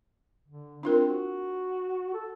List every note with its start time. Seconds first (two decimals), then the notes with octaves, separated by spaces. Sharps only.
0.48 D3
0.83 C4 D4 F4 A#4
1.09 F#4
2.14 A4